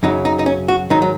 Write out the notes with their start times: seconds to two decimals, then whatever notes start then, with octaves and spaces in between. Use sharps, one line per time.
0.03 F#2 C#3 F#3 D#4
0.25 D#4
0.39 D#4
0.46 C#4
0.68 F#4
0.90 G#2 D#3 F#3 D#4
1.02 F#3